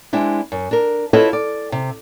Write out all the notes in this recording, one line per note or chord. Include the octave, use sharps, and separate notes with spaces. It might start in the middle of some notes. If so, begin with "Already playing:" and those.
G#3 C4 D4 E4
F#2
D4 A#4
E4 F4 A4 B4 C#5 D#5
D5
C3